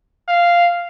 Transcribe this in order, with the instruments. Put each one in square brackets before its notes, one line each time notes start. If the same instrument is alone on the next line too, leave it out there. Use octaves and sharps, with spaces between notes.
[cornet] F5